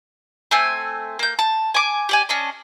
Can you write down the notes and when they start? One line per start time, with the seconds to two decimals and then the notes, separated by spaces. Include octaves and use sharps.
0.51 A3 C4 G#5
1.19 A#3 G6
1.39 A5
1.74 G#5 D6
2.09 G4 D5 G#5
2.29 C#4 D4 D#5